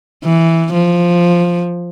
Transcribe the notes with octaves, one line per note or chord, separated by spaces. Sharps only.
E3
F3